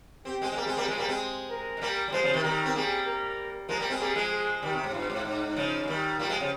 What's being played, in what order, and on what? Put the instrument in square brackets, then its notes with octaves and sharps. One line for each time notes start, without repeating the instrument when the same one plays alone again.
[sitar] C4 [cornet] G4
[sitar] G#3 C4
G#3
[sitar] G3 A#3 [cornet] G#4
[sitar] G#3 C4
G3 A#3
F3 G#3
G3 A#3
G#3 C4
[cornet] A#4
[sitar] G#3
G3 A#3
G3
[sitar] F3 G#3 [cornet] C5
[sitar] C#3 F3
C3 D#3
[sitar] D#3 G3 [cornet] A#4
[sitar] C4
[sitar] G3 A#3 [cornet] G#4
[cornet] A#4
[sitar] F3 G#3 [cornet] A#4
[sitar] G3 A#3
G#3 C4
[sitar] G3 A#3 [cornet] G#4
[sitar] F3 G#3
[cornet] G#4
[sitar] D#3 G3 [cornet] G4
[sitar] C3
G#2
[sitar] G2 [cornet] F4
[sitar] G#2
[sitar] G#2 [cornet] D#4
[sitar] C#3 F3
G#3
D#3 G3
[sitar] G3 A#3 [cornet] F4
[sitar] F3 G#3
C#3 F3